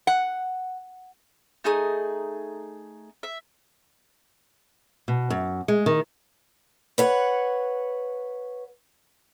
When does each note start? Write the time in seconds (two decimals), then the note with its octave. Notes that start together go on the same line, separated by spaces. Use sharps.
0.07 F#5
1.64 A3 D#4 G#4 D#6
3.23 E5
5.08 B2
5.30 F#2
5.68 G#3
5.86 D#3
6.98 B4 C#5 F#5